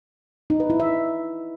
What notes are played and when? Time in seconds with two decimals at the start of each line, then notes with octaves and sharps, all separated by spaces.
0.50 D#4
0.60 B4
0.70 E4
0.80 E5